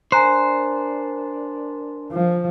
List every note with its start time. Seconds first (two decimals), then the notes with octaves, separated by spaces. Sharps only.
0.12 D4 A#4 C5 G#5 A#5 F#6
2.12 F3